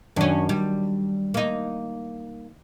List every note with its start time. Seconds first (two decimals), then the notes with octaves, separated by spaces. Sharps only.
0.16 F#2 D#3 F#3 C#4 D4
0.49 G3
1.34 A#3 D#4